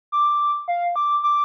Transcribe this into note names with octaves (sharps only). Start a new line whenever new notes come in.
D6
F5
D6
D6